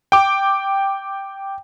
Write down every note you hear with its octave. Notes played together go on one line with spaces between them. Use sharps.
G5 D6